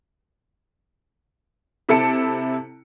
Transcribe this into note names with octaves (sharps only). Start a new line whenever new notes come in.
C3 E4 A4 A5 C#7 D7